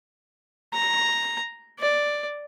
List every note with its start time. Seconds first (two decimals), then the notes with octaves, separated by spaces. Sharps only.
0.74 A#5
1.79 D5